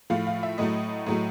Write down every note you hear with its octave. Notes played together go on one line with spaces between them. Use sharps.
A2 F3 A3 F5
F5
E5
A2 F#3 A3 D#5
A2 F#3 A3